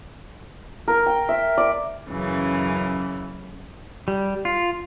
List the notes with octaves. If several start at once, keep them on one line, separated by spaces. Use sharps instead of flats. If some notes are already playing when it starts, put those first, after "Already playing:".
A#4
G5
E5
D5
F#2 C#3 E3
G3
F4